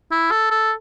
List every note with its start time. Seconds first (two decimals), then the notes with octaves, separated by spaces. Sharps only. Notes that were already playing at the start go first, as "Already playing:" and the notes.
0.11 E4
0.31 A4
0.51 A4